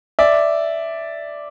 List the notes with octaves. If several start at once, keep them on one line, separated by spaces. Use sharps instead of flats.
D5 E5